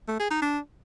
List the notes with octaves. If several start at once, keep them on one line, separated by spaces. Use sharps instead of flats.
A3
G#4
D#4
D4